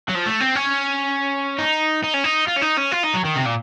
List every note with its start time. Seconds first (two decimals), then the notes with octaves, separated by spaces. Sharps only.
0.09 F#3
0.15 F3
0.26 A3
0.41 C4
0.55 C#4
1.59 D#4
2.04 D#4
2.14 C#4
2.24 D#4
2.48 F4
2.57 C#4
2.62 D#4
2.78 C#4
2.92 F4
3.03 D#4
3.14 F#3
3.25 D#3
3.36 C3
3.45 A#2